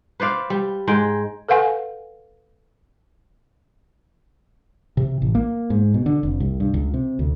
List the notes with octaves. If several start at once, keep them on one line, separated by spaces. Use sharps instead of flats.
B4 C5 D5 F5
G3
G#2 G#3 G5
A4 B4 F5 F#5 G#5
C3
A1
A#3
G#2
B2
D3
F1
C2
G2
C#2
C3
D2